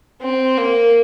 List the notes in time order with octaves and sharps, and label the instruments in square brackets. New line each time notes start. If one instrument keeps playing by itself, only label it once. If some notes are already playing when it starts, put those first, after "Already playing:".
[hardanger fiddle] C4
A#3